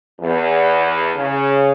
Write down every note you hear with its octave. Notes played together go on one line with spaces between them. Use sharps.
E2
C#3